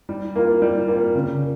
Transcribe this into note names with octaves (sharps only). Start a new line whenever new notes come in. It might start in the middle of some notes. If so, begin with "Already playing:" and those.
G3
A#3 F4
G3
A#3 F4
C#3